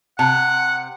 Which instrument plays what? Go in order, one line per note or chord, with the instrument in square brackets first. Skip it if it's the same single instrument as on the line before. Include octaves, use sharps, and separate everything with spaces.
[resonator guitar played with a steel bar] C3 [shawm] F#5 [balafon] A5